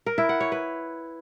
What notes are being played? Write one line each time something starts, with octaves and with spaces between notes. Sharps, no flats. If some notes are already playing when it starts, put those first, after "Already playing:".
A#4
E4
F#5
C#5
B4